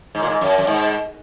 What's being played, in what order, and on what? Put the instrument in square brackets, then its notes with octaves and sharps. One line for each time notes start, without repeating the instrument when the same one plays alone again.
[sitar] G#2
A#2
G#2
F#2
F#2
G#2